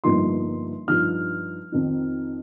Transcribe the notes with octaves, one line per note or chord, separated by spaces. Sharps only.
G1 G2 F3 A#3 D#4 C6
G2 F3 D#4 F6
F2 D#3 C4 D#4